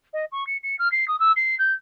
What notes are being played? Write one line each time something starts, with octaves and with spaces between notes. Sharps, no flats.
D#5
C#6
C#7
C#7
F6
C7
D#6
E6
C7
G6